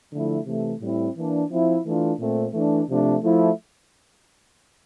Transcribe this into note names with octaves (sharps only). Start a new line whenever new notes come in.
D3 F3 A3 E4
C3 E3 A3
A2 G3 C4 E4
E3 A#3 D4
F3 C4 E4
E3 A3 D4 F4
A#2 A3 C4
E3 A3 D4
C3 F3 A3 D4
F3 A3 E4